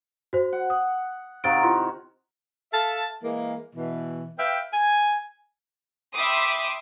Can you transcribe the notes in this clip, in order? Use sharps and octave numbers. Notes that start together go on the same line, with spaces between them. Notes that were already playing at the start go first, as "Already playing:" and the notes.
F#4 C5
F#5
D#6
C3 D#3 F#4 F5 A6 D7
E4 F4 C6
A4 E5 F5 A5
E3 G#3 A#3
B2 E3
B4 E5 F5 G5
G#5
E5 G5 B5 C6 D6 D#6